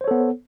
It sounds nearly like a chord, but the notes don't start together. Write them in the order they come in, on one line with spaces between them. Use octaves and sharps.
C5 C#5 A4 B3